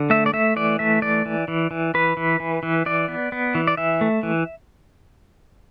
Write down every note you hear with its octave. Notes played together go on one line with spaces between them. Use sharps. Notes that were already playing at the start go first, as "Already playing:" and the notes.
Already playing: D3
A3 E5
D5
A3 E5
E3 D5
A3 E5
E3 D5
E3
E3
E3
E3 B4
E3
E3
E3
E3 D5
B3
B3
E3
D5
E3 E5
A3
E3